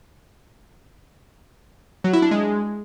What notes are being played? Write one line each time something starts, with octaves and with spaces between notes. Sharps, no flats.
F#3
E4
D4
G#3